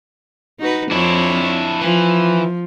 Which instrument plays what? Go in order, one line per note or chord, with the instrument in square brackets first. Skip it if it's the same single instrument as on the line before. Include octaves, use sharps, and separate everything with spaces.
[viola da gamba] D#4 F#4 B4
[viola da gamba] F2 C4 C#5 [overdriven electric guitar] D4 E4
[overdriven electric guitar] E3 [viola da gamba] F3